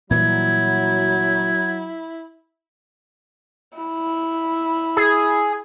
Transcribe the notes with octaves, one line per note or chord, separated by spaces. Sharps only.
A#2 E3 F#3 G3 E4 G#6
E4
G#4